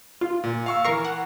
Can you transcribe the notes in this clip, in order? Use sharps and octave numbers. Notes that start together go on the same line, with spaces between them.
F4
A#2
F5 C#6 E6
E3 A#4 C#6 C7
F#5